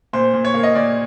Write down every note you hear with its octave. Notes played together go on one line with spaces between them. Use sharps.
A#2 C5
A#2
C#5
A#3
D#5
A#2 D5